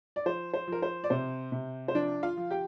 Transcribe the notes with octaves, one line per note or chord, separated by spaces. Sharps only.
D5
F3 C5
C5
F3 A#4
C5
D5
C3 C5
C3
C5
F3 D4 D5
F4 F5
F3
G4 G5